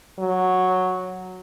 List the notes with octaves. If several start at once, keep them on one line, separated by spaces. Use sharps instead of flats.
F#3